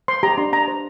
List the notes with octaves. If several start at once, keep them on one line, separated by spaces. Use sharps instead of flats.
C5 C6
G4 A#5
D4 C6
D4 A#5
C5